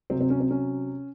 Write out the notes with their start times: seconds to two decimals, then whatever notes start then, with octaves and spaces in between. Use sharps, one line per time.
0.10 C3 F#3 C4
0.20 C4
0.30 C#4
0.40 C4
0.51 C#4